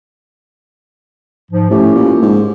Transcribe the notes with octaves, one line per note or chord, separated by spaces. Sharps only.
G#2 F3
A2 C#4 G4
A#2
G#2